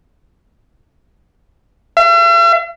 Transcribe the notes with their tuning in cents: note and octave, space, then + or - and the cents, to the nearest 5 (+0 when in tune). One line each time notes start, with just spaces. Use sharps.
E5 +45